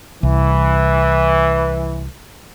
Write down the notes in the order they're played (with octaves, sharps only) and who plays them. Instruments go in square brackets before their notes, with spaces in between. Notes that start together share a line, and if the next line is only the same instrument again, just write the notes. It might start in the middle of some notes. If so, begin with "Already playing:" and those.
[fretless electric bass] C2 [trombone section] E3